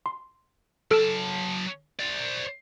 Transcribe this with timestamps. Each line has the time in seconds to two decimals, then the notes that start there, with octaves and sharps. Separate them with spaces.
0.06 C6
0.91 F#3 A4 A5 F6 D7
1.99 C5 D5